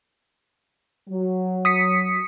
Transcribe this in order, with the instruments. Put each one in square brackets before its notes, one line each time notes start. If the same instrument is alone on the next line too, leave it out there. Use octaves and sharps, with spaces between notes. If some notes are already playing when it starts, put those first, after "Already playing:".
[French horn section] F#3
[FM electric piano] D#6 B6 C#7